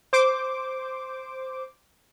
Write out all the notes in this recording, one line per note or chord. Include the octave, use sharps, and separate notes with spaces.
C5 D6